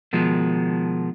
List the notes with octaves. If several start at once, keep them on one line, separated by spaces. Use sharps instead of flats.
B2 D#3 F3 G#3